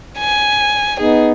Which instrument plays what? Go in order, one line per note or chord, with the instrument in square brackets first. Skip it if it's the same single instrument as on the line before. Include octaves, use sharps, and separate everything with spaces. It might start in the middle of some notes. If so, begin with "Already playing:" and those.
[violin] G#5
[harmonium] B3 D#4 [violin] G#4